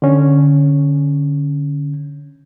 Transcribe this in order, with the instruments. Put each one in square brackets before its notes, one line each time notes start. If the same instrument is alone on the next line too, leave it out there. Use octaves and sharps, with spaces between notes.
[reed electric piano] D3 C#4